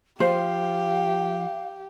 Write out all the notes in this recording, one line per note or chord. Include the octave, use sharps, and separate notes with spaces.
F3 G4 C5 F5